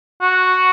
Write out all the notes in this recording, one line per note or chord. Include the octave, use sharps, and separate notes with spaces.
F#4